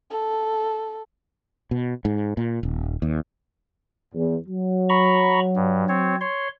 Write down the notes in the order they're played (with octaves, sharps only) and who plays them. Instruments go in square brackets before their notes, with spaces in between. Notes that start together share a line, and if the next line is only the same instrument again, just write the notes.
[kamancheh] A4
[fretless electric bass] B2
G#2
A#2
D#1
D#2
[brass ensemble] E2
F#3
[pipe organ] A#5 B5 C#6
G2
C4 C#5
C#5 C6